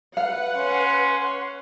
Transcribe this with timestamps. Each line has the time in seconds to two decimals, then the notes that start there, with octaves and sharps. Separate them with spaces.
0.17 B4 F5 F#5
0.56 C#4 C6